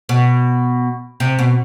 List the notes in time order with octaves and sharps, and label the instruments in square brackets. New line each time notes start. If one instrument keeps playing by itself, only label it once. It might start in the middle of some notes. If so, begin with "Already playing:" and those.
[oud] B2
C3
B2